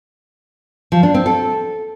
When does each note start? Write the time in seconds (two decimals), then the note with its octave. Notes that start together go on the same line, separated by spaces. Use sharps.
0.92 F3
1.03 D4
1.14 C4
1.26 A4